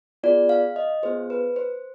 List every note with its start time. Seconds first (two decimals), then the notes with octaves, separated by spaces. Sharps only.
0.23 B3 F4 G#4 D5
0.49 F5
0.76 D#5
1.03 B3 F4 G#4 C5
1.30 B4
1.56 C5